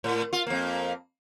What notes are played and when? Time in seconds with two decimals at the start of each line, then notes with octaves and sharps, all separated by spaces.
0.04 A2
0.33 F4
0.47 F2 A#3